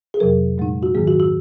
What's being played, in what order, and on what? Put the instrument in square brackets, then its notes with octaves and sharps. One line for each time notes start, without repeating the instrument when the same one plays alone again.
[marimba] G#4
F2 C3 F#3 A#4
A#2 G#3 D#4
F#4
G#2 D#3 F#3 A#3 G#4
F#4
F#4